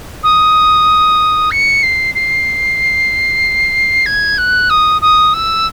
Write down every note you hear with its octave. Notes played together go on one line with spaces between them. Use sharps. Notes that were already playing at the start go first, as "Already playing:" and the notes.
D#6
C#7
C7
C7
G#6
F#6
D#6
D#6
E6